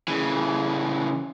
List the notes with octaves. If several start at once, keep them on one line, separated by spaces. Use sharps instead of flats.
C#3 E3